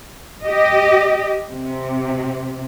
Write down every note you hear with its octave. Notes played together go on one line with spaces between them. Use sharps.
G4 D#5
C3